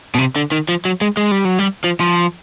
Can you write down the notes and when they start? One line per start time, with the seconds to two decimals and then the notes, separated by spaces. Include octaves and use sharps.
0.15 B2
0.19 C3
0.36 D3
0.52 D#3
0.69 F3
0.85 F#3
1.01 G#3
1.17 G#3
1.31 G3
1.45 F#3
1.59 G3
1.84 F3
2.00 F3